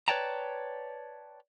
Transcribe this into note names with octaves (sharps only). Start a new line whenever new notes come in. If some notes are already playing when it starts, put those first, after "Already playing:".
B4 C#5 D5 G5 A5 A#5